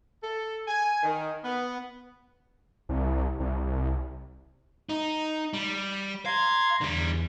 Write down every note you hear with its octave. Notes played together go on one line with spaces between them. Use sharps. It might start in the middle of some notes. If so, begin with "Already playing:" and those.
A4
G#5
D#3
B3
C2
C2
D#4
G3
F5 A#5 C6 G#6
E2 D3 G3